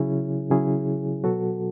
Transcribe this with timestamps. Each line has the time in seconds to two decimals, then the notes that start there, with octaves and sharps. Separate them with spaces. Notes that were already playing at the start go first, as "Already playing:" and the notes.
Already playing: C#3 F#3 C#4 E4 G#4
0.50 C#3 F#3 C#4 E4 G#4
1.23 B2 F#3 B3 F#4 A4